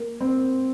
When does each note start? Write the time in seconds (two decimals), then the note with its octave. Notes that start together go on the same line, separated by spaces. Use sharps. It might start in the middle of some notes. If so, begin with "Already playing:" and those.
Already playing: A#3
0.21 C4